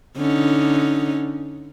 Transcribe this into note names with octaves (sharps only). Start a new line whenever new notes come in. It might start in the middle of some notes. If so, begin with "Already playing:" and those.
D3 C#4 D#4